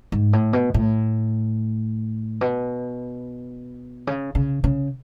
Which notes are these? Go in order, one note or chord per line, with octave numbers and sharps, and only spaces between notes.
G#2
A2
B2
A2
B2
C#3
C#3
C#3